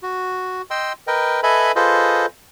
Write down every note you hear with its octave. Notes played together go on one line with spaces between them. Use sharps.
F#4
D#5 G5 C6 E6
A#4 B4 D#5 G5
A4 B4 D#5 E5 G#5 B5
F4 G#4 A4 B4 C5 D#5